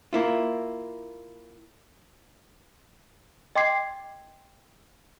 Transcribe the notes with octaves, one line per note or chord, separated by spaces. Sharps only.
A#3 E4 F4
D#5 G5 C6 D6 G#6 C7